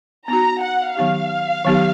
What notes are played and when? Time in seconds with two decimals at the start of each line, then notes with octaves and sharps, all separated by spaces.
0.28 B3 D#4 F#4 A#5
0.62 F#5
0.97 D#3 F#3 B3 D#4 G4 F5
1.65 D#3 F#3 B3 D#4 G4